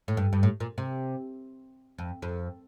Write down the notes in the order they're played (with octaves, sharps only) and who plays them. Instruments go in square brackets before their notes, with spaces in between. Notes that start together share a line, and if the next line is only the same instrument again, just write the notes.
[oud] A2
G2
G2
A2
A#2
C3
F2
F2